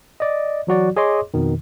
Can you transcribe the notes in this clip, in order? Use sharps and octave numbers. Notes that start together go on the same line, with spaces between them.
D5 D#5
E3 F#3 F#4 D5
G#4 C#5 D#5 C6 D6
F2 B2 D#3